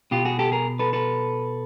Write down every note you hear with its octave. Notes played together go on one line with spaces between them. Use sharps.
B2 F4 G4
F#4 G#4
G4 A4
G#4 A#4
A4 B4
A4 B4